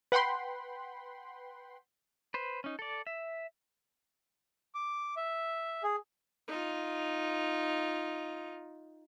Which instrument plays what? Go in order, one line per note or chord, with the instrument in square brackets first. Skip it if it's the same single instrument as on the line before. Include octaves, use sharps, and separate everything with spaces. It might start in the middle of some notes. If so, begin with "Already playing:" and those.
[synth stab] B4 F#5 G5 B5 C6
[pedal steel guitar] B4 C5
C#4 D#4
A4 D5
E5
[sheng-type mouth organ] D6
E5
G#4
[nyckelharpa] D#4 F4